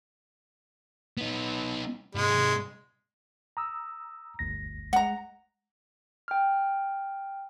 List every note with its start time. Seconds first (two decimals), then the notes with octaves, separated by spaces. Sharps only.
1.18 B3 D#4
2.15 G#2 C3 G#3
3.57 A#5 D#6 E6
4.39 G1 D2 A#6
4.93 G#3 F#5 A#5
6.28 G5 F6